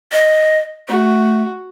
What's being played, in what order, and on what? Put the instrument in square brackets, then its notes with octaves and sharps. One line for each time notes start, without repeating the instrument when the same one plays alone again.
[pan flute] D#5
[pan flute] A3 [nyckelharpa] F#4